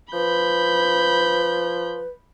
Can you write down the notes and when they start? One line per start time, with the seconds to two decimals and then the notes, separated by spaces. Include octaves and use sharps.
0.13 F3 B4 B5 G6